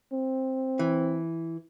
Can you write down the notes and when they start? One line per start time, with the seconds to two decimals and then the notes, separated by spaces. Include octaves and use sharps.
0.13 C4
0.79 E3